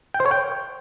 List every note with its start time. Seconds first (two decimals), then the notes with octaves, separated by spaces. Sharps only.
0.14 G5
0.20 C5
0.26 C#5
0.31 G5